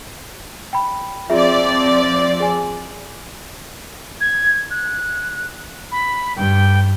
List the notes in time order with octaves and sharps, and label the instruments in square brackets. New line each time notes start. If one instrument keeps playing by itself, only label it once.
[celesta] G5 B5
[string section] F3 C4 D5 [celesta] F4 G#4 E5
[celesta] G#4 G#5
[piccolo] G#6
F#6
B5
[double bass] G2 [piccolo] G5